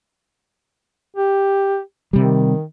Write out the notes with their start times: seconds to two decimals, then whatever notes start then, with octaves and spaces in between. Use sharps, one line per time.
1.17 G4
2.13 C3 D#3 G3